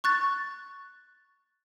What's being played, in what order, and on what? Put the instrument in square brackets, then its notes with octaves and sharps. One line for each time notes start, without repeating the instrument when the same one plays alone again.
[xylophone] C#6 F#6 A6